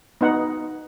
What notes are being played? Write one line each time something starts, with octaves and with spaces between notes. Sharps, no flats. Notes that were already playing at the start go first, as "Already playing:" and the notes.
B3 D#4 F#5